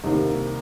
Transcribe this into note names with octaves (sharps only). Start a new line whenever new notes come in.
C2 C3 D#3 A#3 D#4